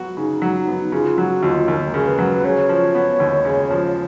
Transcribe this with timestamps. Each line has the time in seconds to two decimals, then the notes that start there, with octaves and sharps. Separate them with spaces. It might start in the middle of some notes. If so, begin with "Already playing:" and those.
Already playing: F#3 B3 F#4
0.16 C#3 D#4
0.42 F#3
0.68 B3
0.92 C#3 F4
1.18 F#3 F#4
1.43 D#2 F4
1.68 D#2 A#4
1.94 C#3
2.06 B4
2.18 F#3
2.44 C#3 C#5
2.69 F3
2.95 B3
3.20 D#2
3.45 C#3
3.70 F3